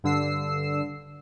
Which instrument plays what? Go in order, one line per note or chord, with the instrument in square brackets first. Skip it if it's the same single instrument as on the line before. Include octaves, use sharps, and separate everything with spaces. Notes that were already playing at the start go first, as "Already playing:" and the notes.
[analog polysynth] G2 D3 E6 C7